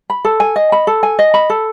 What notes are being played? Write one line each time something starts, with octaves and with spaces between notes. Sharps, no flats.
B5
A4
G#5
D#5
B5
A4
G#5
D#5
B5
A4